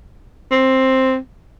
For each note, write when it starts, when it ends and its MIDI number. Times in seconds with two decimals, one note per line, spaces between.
0.52 1.17 60